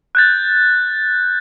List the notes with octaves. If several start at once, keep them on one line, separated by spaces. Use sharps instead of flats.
F#6 G6 A6